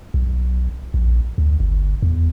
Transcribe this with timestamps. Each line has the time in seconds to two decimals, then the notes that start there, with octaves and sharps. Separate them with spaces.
0.14 B1
0.94 A#1
1.38 D2
1.60 G1
2.02 E2